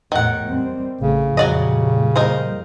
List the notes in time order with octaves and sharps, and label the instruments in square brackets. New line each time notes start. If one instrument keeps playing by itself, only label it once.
[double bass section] E2 A2 [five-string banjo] D#3 F#5
[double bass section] G3 C4
[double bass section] A1 [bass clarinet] C#3
[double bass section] F2 A#2 G3 [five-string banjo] F#3 D5 D#5
[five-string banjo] D#4 A#4 C5